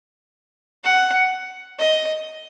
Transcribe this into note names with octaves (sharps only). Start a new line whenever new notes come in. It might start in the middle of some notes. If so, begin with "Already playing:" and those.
F#5
D#5